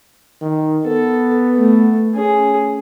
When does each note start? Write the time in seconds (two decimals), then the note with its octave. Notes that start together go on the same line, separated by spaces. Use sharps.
0.42 D#3
0.86 B3 A4
1.55 A3
2.15 C#4 G#4